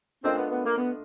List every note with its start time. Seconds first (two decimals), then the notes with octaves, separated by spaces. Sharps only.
0.24 A3 C4 D4 F4 A#4 D#5
0.37 B3
0.51 B3
0.65 A#3
0.78 B3